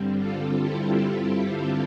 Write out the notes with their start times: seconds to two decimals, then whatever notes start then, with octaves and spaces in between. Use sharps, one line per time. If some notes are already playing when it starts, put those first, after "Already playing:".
Already playing: G2 D3 G3 C4
0.17 F4 A4
0.61 E4 G4
1.21 E4
1.51 F4